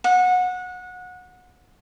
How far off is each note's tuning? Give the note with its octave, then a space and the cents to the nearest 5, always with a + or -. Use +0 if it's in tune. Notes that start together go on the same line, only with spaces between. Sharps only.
F#5 -25